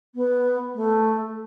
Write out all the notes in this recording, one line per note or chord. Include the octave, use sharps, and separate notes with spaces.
B3
A3